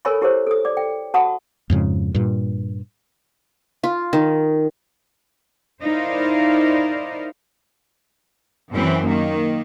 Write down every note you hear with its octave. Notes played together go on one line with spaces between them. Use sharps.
A4 A#4 C#5 G#5 B5 C#6
E4 G4 G#4 A#4 C5 C#5
A4 D#6
D5 D6
G5
F#4 F#5 A5 A#5 C#6 D#6
F2 G#2 C#3
G2 A#2
F4
D#3
D#4 E4 A#4 C5 D5 F5
F#2 E3 C4
D#3 A#3